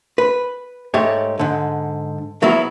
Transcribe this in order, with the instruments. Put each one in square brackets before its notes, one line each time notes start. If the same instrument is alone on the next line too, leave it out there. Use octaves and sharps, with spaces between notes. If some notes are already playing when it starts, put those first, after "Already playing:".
[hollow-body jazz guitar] B4
G#2 A3 G4 C#5
G#2 D3
C#3 F#3 B3 E4